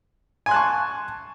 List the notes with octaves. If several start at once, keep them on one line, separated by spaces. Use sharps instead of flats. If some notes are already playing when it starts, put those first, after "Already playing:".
G#5 A5 C6 C#6 F#6